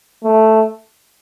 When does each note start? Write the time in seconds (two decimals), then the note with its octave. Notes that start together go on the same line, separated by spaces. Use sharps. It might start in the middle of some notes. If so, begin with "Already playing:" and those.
0.24 A3